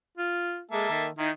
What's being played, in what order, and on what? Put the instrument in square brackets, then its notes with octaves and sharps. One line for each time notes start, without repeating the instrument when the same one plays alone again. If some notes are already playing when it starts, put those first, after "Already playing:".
[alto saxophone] F4
[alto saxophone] G#3 [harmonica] A#3 A4 E5
[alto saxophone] D#3
[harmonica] D#3 E4 [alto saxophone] D#4